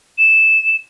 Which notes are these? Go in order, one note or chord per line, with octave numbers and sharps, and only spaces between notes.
E7